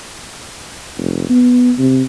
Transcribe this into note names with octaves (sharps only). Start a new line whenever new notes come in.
F1
B3
C3